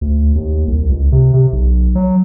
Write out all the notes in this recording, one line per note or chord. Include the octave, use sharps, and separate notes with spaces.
D2
D#2
C2
C#2
C3
C3
B1
F#3